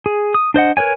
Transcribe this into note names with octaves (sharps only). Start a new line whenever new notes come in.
G#4
D#6
D4 C5 D#5 F#5
A#4 B4 C#5 G#5